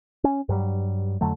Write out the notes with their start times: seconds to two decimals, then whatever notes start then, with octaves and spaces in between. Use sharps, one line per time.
0.24 C#4
0.49 G2 F#3 G3
1.21 F2 D3 F#3 A3